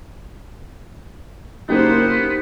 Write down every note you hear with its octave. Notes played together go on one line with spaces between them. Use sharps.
F#1 A#3 B3 D#4 G4 C5 G6